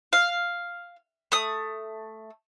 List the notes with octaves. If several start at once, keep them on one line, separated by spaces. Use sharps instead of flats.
F5
A3 D#6